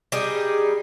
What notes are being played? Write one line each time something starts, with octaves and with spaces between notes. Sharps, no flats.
G3 D#4 G#4